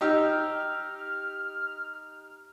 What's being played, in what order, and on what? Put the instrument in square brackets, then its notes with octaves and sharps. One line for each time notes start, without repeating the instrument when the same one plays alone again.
[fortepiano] D#4 G4 E6 [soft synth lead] F6